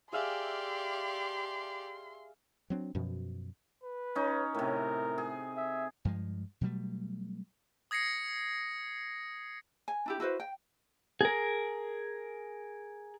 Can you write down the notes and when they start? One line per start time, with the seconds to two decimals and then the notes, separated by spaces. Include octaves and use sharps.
0.13 G4 G#4 D5 E5 F5 C6
2.70 F#3 C4 D4
2.95 F#2 B2 F3
3.83 B4
4.15 C#4 D#4
4.55 A2 C3 A#4
5.18 G#4
5.56 E5
6.05 G2 F3 G#3
6.61 B2 F#3 G3 A3
7.91 D#6 G#6 A#6 C7 C#7
9.88 G#5
10.06 D4 E4 G4
10.20 E4 F#4 B4 C5
10.40 G5
11.21 G#4 A#4